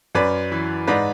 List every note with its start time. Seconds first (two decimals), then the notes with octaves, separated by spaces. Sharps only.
0.15 F#2 B4 D5
0.52 E3
0.87 G#2 B4 D5